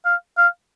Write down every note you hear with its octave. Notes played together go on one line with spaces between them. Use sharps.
F5
F5